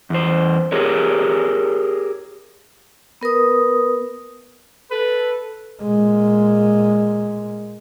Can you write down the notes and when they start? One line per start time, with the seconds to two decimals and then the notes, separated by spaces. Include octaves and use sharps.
0.10 E2 C5
0.72 G4 G#4 A#4 C#5
3.21 B3 A#4 B4 D#6
4.91 A4 B4
5.82 A#2 G#3